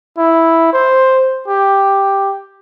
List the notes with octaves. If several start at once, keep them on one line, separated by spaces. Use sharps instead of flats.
E4
C5
G4